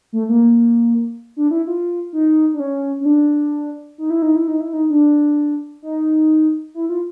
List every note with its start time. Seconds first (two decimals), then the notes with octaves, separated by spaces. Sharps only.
0.13 A3
0.29 A#3
1.37 D4
1.51 E4
1.67 F4
2.13 D#4
2.54 D4
2.60 C#4
3.00 C#4
3.05 D4
3.98 D#4
4.10 E4
4.22 D#4
4.36 E4
4.48 D#4
4.60 E4
4.73 D#4
4.90 D4
5.82 D#4
6.74 E4
6.89 F4